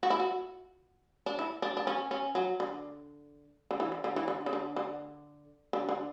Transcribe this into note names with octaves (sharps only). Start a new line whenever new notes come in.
F#4
E4
F#4
D4
E4
D4
D4
C#4
C#4
F#3
D3
D3
E3
D3
D3
E3
D3
C#3
D3
D3
D3
D3